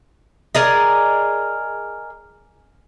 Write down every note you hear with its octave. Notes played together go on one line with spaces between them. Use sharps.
G#4 A#4 D5 D#5